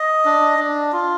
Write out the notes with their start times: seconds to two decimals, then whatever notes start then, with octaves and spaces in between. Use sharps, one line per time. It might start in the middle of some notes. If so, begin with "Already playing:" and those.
Already playing: D#5
0.25 D4
0.59 D4
0.92 F4